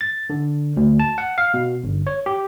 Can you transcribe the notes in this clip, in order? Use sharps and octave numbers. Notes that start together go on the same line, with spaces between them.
A6
D3
D2
A5
F#5
F5
B2
G1
C#5
G4